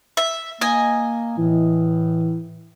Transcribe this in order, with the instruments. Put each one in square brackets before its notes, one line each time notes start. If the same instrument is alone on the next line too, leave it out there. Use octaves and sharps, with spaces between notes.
[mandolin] E5
[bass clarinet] A#3 [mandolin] D#5 G#5
[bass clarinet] A2 [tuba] E3